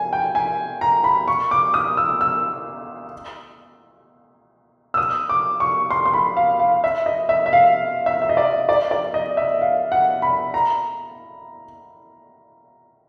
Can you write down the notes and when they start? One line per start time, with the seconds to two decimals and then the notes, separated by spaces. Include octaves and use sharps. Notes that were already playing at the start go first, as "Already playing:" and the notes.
Already playing: G#5
0.13 G5
0.35 G#5
0.81 A#5
1.04 B5
1.28 C#6
1.51 D6
1.74 D#6
1.97 E6
2.21 E6
4.94 E6
4.97 D#6
5.29 D6
5.60 C#6
5.91 C6
6.06 C6
6.14 B5
6.37 F5
6.59 F5
6.84 E5
7.06 D#5
7.29 E5
7.46 E5
7.53 F5
8.06 E5
8.22 E5
8.29 D#5
8.37 D5
8.69 D5
8.91 D5
9.14 D#5
9.37 E5
9.61 F5
9.92 F#5
10.22 B5
10.54 A#5